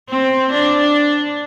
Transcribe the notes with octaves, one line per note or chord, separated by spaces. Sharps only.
C4
D4